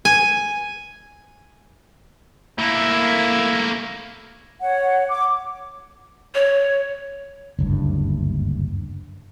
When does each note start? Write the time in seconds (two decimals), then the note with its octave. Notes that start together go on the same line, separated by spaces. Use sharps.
0.05 G#5
2.59 A3 A#3 E4
4.61 C#5 F#5
5.09 D6
6.34 C#5
7.59 F#1 D2 G2